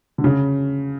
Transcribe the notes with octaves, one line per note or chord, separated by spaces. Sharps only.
D3
C#3